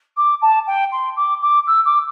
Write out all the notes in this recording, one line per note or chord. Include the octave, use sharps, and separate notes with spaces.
D6
A5
G5
C6
D6
D6
E6
D6